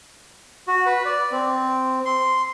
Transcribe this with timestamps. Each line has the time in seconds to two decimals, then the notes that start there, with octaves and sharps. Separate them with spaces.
0.68 F#4
0.86 B4
1.05 D5
1.32 C4
2.05 C6